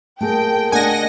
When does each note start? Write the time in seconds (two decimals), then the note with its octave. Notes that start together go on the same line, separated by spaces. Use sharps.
0.21 A3 A#3 G#4 A#4 G5 A5
0.72 A3 A#3 D4 D#5 F#5 G#5 A#6